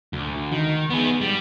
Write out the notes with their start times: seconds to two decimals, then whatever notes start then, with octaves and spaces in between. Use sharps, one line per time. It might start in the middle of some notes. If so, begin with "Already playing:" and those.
0.13 D2
0.52 D#3
0.90 B3 G#4
1.21 G3